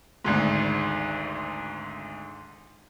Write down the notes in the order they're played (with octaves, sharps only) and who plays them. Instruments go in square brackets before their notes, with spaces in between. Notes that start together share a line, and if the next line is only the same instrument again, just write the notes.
[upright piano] G#1 D2 G#2